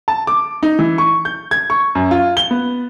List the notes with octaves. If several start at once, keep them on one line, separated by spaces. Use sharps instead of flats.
A5
D6
D#4
E3
C#6
G6
G#6
C#6
F#2
F4
G7
B3